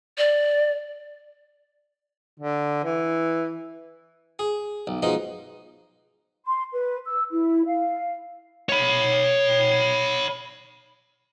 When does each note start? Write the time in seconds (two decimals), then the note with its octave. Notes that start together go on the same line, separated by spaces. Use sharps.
0.18 D5
2.40 D3
2.84 E3
4.39 G#4
4.87 B1
5.03 B2 F3 G#3 D#4
6.46 C6
6.73 B4
7.06 E6
7.31 E4
7.66 F5
8.69 C#5 B5